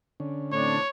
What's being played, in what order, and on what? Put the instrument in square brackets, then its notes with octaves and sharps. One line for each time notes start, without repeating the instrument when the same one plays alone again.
[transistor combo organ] D3 C#4
[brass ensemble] A2 C4 D4 [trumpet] C#5